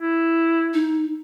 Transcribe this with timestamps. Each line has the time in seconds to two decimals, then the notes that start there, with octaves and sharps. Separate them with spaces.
0.01 E4
0.74 D#4